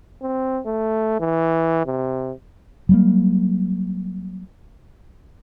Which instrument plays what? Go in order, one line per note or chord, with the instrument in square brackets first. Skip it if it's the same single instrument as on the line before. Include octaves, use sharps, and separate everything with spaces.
[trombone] C4
A3
E3
C3
[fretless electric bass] F#3 G3 A#3